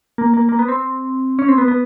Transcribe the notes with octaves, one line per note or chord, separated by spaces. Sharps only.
A#3
A#3
A#3
B3
C4
C#4
C4
B3
B3